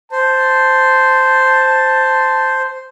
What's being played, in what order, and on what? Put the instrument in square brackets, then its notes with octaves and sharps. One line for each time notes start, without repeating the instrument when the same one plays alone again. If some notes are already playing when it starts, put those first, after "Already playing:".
[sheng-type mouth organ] C5 [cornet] A5